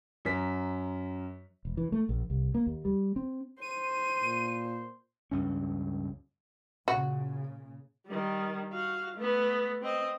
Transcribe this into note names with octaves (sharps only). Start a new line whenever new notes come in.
F#2 A#4 B6
E1
E3
A3
A#1
C2
A#3
D#2
G3
C4
C5 D#7
A#2
C#2 G2 C#4
A#2 C#3 F#4
D#3 G3
F#4 F5
A3 B3
C4 D#5